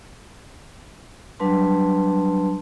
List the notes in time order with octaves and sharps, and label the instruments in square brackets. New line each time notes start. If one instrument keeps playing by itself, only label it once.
[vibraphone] F#3 G3 D4 B4 A5 C6